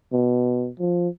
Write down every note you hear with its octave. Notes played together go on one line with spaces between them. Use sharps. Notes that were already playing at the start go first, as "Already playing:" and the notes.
B2
F3